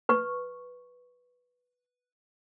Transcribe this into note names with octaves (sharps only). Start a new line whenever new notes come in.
B4 C#6